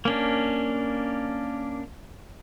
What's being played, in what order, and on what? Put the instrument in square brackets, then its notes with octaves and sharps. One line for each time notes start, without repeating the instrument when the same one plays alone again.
[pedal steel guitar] A#3 C#4 D4